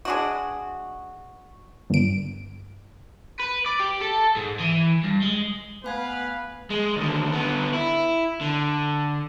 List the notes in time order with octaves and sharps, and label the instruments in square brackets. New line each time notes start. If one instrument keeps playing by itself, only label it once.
[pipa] G#3 D4 F#4
[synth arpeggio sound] G1 D7
[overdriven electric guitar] B4
D5
G4
A4
G#2
E3
G2
G#3
[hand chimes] A3 G#5 G#6 [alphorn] B3 [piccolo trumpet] B4 [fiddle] F5
[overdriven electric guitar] G#3
D#2 D3
D3 B3
E4
D3